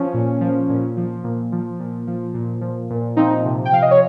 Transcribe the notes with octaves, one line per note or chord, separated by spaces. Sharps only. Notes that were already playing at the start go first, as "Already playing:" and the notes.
Already playing: F3 C#4
A#2
F3
A#2
F3
A#2
F3
A#2
F3
A#2
F3
A#2
F3 C4 D#4
C3
G5
F3 F5
D#5
C#5